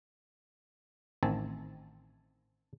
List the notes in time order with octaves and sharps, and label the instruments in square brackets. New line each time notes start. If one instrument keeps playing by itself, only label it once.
[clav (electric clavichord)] A1 D#3 C4 G#5 A5